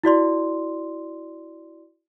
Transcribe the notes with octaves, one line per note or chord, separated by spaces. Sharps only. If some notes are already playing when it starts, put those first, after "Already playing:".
E4 F#4 D5 C6